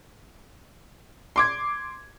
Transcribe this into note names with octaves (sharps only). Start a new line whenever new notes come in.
C6 D6 G#6